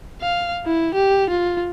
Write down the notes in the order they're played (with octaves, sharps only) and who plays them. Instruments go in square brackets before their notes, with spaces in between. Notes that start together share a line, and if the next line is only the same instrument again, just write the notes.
[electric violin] F5
E4
G4
F4